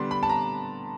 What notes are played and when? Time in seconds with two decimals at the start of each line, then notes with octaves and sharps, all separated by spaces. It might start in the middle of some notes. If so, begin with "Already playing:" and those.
Already playing: D3 G3 B3 D4 C6
0.11 B5
0.23 A5
0.29 A#5